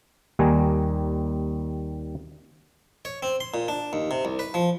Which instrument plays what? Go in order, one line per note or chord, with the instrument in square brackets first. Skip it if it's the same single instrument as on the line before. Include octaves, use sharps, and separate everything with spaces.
[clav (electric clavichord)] D#2 D#3 G3 G#5 A#5
[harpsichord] C#5
C4
C6
A#2
D4
D#2
C3
C2
B4
F3